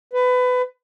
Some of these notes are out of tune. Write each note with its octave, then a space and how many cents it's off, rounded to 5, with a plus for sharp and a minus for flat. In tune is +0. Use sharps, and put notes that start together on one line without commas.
B4 +25